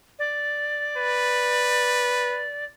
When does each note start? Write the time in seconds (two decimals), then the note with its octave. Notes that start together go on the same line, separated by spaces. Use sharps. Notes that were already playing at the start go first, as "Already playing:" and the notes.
0.19 D5
0.97 B4